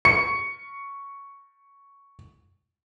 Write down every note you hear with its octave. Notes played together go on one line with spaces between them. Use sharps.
C#6 C#7